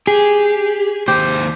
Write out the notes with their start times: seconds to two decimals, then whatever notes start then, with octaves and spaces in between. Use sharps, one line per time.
0.07 G4 G#4
1.08 D#2 G4 C5